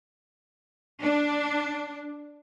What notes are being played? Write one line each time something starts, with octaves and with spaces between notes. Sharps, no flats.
D4